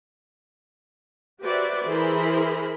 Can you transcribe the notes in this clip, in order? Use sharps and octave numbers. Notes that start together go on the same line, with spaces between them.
F#4 G4 B4 C5 D5 E5
E3 E4 G#4 A#4 C5 B5